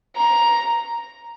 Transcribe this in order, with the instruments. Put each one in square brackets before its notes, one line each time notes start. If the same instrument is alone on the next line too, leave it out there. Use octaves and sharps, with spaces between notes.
[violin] A#5